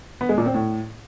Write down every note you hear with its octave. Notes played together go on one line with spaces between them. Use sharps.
B3
G#3
A#2
C4
A2